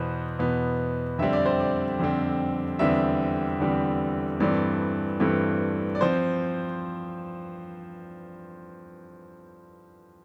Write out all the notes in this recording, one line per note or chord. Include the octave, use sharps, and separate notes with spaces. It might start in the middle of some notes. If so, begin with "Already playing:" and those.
Already playing: E2 B2 B3 C5
E2 B2 B3
F2 D3 G3 C4 E5
D5
C5
D5
F2 D3 G3 C4
E2 D3 G3 C4 E5
E2 D3 G3 C4
G2 E3 A3 C4 D5
G2 E3 A3 C4
D5
F3 C4 C5